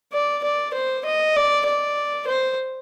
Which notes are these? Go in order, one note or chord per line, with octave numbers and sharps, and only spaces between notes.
D5
D5
C5
D#5
D5
D5
C5